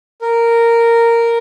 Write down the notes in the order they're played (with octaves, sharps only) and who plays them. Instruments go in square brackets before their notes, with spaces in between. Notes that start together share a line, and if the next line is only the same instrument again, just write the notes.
[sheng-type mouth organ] A#4